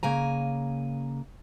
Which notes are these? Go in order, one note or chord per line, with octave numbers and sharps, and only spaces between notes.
C#3 A#3 G#5 A#5